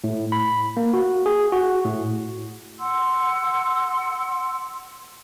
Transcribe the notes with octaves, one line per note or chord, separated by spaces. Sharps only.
A2
B5
A#3
F#4
G#4
F#4
A2
F#5 C6 E6